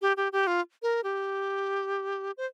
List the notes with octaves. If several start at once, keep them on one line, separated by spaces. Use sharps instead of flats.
G4
G4
G4
F4
A#4
G4
C5